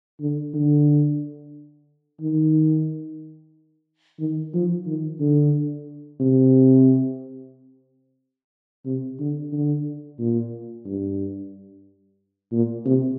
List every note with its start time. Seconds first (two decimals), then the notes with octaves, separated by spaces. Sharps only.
0.20 D3
0.54 D3
2.20 D#3
4.20 D#3
4.54 F3
4.86 D#3
5.20 D3
6.20 C3
8.86 C3
9.19 D3
9.53 D3
10.19 A#2
10.86 G2
12.52 A#2
12.86 C3